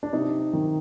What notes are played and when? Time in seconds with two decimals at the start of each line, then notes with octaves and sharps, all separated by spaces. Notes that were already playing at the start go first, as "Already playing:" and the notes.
0.03 D4
0.13 C3 D#4
0.53 D#3